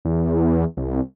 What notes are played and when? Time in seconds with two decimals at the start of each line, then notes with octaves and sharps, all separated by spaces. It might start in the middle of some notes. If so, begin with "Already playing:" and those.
0.05 E2
0.77 C2